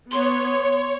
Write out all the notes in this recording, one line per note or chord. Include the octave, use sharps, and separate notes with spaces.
B3 C#5 C6